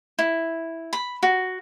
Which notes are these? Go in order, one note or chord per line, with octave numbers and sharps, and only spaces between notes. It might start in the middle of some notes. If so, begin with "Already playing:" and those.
E4
B5
F#4